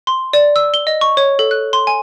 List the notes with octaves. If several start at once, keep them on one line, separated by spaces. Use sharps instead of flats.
C6
D5
E6
G7
D#5
C#6
C#5
A4
F#6
C6
G#5